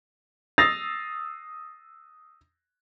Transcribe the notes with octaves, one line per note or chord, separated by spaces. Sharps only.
D#6 E6 A6 A#6 C7 F7